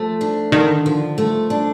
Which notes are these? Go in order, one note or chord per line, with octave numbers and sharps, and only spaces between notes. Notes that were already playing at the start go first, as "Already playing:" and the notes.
Already playing: F3 A3
D4
D3 D#3
F3
A3
D4